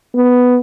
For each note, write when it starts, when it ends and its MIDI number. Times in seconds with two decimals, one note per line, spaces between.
0.15 0.58 59